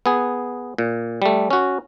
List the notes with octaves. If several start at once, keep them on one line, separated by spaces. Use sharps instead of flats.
B3 G#4
A#2
G3 A3
C#4 F#4